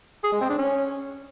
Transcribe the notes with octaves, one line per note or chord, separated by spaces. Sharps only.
G#4
G#3
C4
D4
C#4